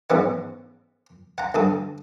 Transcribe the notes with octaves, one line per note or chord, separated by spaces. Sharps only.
A1 G#2 B3 F#5
F#5 A#5
D2 G2 A4 D#6